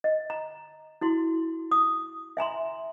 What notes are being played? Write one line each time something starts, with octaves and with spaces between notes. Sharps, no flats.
D#5
A#5
E4 F#4 C6
D#6
E5 G#5 A#5 C6